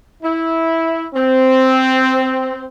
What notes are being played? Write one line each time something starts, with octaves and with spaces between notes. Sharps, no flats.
E4
C4